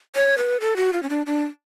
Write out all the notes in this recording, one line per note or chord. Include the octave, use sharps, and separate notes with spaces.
C#5
B4
A4
F#4
F4
C#4
D4
D4